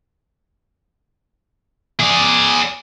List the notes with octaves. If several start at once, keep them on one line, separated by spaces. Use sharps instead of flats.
G#4 D5